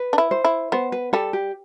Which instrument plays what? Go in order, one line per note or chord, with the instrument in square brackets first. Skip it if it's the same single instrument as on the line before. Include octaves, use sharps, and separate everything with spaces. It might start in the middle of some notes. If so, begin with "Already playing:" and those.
Already playing: [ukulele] B4
[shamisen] D4
E4
[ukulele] C5
[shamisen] E4
[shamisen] B3 [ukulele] C5
[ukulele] B4
[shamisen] G3 [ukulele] A4
[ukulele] G4